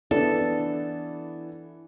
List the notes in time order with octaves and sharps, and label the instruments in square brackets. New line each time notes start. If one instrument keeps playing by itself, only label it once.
[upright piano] E3 B3 D4 [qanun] A4